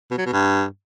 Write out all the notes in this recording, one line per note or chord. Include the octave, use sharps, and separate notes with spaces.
B2
F#3
B2
G2